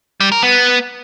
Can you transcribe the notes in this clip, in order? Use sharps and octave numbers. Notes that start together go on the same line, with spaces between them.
G3
A#4
B3